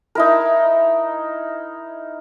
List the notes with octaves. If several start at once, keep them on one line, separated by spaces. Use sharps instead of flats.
D#4 E4 A#4